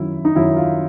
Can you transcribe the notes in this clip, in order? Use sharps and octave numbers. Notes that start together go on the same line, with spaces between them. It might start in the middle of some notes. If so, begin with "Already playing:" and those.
Already playing: F#2 D#3 F#3 E4
D#4
F#2 D#3 F#3 E4
F4